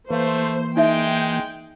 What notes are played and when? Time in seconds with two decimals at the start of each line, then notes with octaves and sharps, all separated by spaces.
0.10 E3 A3 A#3 C5
0.77 G#3 D#4 E5 G5